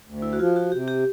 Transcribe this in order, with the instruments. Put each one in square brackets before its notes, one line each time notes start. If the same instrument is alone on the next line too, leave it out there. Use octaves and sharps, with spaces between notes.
[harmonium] D2
[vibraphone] E4
F#4
[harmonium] F3 [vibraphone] F4
[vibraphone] F#4
[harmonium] C3 [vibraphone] G4
[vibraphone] G4